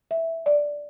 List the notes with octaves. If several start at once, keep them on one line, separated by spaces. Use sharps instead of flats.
E5
D5